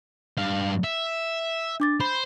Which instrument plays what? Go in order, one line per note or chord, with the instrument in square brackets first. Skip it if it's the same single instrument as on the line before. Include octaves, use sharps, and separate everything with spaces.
[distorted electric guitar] G2 F5
E5
[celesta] D4 D6 A6
[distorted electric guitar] C5 [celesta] B5